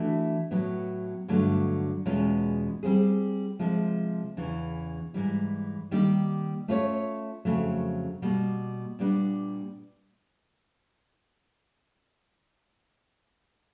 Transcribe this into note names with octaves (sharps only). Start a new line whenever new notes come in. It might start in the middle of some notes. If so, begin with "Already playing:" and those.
Already playing: E3 A3 D4 F#4
A2 F#3 B3
G2 D3 F#3 A3
E2 B2 G#3 C#4 F4
G3 C4 F4 G#4
C3 F3 G#3
E2 C#3 E3
G#2 E3 G3
D#3 G3 A#3 D#4 G4
A3 C#4 F4 A#4 C#5
F2 C#3 F#3 A3
B2 G3 A#3
A#2 G3 B3 D4